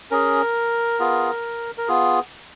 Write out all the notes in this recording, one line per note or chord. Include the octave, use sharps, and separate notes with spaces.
C#4 G#4 A#4
B3 F4 G#4
A#4
B3 F4 G#4